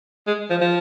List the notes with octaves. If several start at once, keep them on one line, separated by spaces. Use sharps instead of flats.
G#3
F3
F3